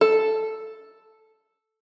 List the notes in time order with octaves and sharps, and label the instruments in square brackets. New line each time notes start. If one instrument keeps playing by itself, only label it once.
[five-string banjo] A4